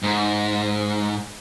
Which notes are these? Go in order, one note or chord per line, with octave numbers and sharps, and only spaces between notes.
G#2